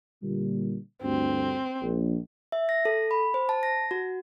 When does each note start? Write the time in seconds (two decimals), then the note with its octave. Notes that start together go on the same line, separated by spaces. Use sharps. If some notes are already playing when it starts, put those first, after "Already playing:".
0.23 A#2 D3 G3
1.03 D2 G2 C4
1.81 A#1
2.52 E5
2.69 A#6
2.85 A4
3.11 B5
3.34 C5
3.49 A5
3.63 A#6
3.91 F#4